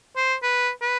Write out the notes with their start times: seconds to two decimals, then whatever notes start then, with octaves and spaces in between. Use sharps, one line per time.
0.16 C5
0.43 B4
0.82 B4